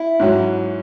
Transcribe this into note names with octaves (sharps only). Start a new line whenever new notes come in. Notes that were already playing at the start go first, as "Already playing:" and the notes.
Already playing: E4
G#2 F#3 C#4 F#4